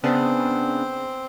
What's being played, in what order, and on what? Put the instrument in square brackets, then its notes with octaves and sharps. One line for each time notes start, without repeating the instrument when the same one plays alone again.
[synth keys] C#3 B3 D4 [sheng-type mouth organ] C4